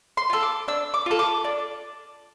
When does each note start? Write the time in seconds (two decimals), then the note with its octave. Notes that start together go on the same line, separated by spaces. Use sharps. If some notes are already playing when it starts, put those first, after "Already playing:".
0.17 C6
0.30 F4 A4
0.43 D6
0.68 D4 E6
0.94 D6
1.06 F4 A4
1.19 D6
1.44 D4